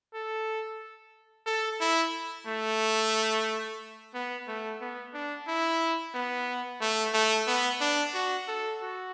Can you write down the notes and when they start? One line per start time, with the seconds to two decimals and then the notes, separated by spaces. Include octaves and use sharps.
0.14 A4
1.46 A4
1.80 E4
2.47 A3
4.14 B3
4.48 A3
4.81 B3
5.14 D4
5.47 E4
6.15 B3
6.81 A3
7.14 A3
7.47 B3
7.81 D4
8.14 F#4
8.48 A4
8.82 F#4